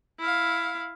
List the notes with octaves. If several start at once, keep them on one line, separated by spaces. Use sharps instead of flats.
E4 F5